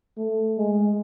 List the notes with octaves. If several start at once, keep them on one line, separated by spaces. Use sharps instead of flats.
A3
G#3